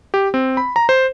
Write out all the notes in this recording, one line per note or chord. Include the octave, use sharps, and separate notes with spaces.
G4
C4
B5
A#5
C5